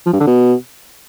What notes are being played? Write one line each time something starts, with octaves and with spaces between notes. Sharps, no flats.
F3
G2
D3
B2